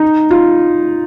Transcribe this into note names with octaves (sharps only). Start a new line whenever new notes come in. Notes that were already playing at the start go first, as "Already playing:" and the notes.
Already playing: D#4
F4